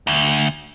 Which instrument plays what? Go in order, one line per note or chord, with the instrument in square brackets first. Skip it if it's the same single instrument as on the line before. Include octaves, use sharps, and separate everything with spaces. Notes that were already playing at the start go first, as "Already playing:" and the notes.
[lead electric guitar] D2